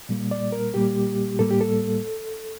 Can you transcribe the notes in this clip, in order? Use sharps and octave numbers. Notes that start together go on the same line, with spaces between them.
A#2 G3 A#3
D5
A#4
A#2 G3 A#3 G4
A2 G3 A#3 A4
G4
A4